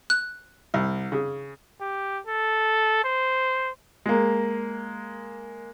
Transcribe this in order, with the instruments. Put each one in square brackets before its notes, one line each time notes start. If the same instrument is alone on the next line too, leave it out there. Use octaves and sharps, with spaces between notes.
[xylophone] F#6
[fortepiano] C2
C#3
[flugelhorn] G4
A4
C5
[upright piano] G#3 A#3